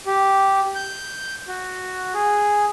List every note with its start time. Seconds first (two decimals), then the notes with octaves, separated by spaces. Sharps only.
0.06 G4
0.75 G6
1.48 F#4
2.14 G#4